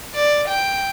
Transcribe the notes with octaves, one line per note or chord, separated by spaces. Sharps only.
D5
G5